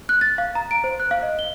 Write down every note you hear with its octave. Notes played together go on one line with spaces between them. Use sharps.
F#6
A6
F5
A#5
D7
C5
F#6
F5
D#5
G7